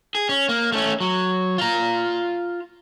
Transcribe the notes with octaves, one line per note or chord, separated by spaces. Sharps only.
G#4
C#4
A#3
A3 C#4
F#3
F4 A#5